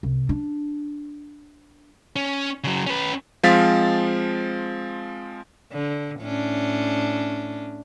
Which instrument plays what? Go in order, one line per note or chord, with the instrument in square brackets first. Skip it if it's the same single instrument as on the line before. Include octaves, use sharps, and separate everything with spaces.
[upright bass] C2
D4
[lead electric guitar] C#4
C#3 F#3
C#4 B4
[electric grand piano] F3 G#3 C4 F5 A6 B6
[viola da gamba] D3
A2 C#4 D4